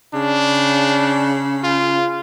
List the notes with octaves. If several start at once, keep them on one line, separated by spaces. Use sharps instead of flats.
C#3 D4
F4